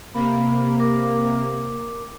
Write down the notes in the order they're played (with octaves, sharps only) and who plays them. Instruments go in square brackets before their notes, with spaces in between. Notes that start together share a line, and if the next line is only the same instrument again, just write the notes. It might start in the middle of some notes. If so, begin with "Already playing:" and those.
[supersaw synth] C3 A#3 [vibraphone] B5
[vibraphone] A#4 D6